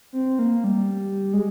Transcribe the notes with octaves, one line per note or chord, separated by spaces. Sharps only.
C4
A#3
G3
G#3